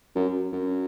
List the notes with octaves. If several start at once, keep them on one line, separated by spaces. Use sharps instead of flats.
F#2
F#2